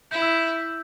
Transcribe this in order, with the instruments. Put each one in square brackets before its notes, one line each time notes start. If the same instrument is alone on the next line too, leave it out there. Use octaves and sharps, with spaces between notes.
[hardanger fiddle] E4 [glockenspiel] G6
[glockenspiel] E6